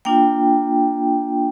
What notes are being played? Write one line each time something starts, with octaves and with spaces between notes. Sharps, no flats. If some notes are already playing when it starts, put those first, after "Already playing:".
A#3 D4 F4 G5